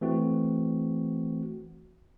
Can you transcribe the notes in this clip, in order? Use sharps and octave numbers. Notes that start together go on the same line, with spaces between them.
E3 A3 C4 F#4